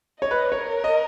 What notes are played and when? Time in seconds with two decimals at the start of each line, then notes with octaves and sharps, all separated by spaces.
0.20 C#5 D#5
0.31 B4
0.52 A#4 C#5
0.84 D#5